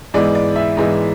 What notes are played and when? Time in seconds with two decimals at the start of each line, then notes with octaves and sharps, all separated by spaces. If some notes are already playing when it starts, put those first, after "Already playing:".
0.14 G#2 E3 G#3 B3 D5
0.35 D5
0.56 E5
0.77 G#2 E3 G#3 B3